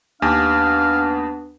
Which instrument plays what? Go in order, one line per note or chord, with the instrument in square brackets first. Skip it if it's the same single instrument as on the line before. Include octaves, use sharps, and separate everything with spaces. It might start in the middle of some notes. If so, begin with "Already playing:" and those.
[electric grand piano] D#2 G4 G#5 [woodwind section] B3 D4 [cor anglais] F5